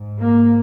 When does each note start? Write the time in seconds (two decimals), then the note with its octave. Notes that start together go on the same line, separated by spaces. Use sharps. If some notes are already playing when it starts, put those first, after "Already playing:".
Already playing: G#2
0.18 A#3